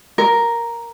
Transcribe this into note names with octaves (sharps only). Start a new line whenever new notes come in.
A#4